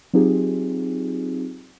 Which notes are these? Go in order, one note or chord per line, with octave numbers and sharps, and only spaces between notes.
F#3 C4 D#4 F4 G4 G#4